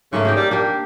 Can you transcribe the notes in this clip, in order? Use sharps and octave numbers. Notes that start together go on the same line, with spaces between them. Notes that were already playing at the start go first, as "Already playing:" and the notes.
G#2 C#3 A3 A#3
A#3 D#4 G4
G3
A#3 D4 G4